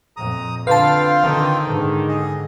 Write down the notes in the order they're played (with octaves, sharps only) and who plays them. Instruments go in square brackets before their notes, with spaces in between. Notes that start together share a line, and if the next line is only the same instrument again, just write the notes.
[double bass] F2 A#2 [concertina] A#5 D#6
[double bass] D3 [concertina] C4 F4 G5 [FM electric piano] B4 A5 [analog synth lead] F5
[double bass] D3 [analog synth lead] D#3
[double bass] G#2 D3
[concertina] G#4 D#5